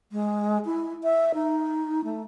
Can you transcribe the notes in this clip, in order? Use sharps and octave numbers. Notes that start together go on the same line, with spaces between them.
G#3
E4
E5
D#4
A3